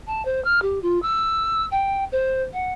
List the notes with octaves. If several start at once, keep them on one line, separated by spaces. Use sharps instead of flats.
A5
C5
F6
G4
F4
E6
G5
C5
F#5